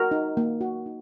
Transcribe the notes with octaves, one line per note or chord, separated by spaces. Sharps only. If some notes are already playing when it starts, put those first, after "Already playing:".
Already playing: F#4 A#4
D#4
A#3
F#4
D#4